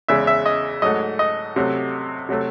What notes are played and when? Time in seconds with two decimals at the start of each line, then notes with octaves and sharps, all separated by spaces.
0.08 E2 C#3 G#3 E5
0.27 E5
0.46 D#5
0.82 G#2 F#3 A3 D#5
1.19 D#5
1.56 C3 F#3 A3
2.29 C3 F#3 A3